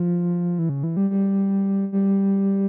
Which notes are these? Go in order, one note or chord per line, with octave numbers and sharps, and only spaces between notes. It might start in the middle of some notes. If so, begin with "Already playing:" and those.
Already playing: F3
E3
C#3
E3
G3
G3
G3